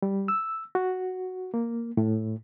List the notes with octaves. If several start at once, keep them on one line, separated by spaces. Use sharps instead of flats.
G3
E6
F#4
A#3
A2